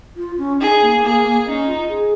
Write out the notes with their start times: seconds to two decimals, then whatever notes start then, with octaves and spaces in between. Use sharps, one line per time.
0.17 F4
0.38 C#4
0.60 D#4 G#4
0.82 A#3
1.02 A#3 G#4
1.24 A#3
1.46 C#4 D#4
1.67 F4
1.89 G#4